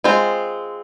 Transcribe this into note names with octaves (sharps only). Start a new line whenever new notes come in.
G#3 C4 F4